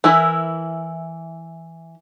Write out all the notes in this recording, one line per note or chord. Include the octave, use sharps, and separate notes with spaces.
E3 E4 A#4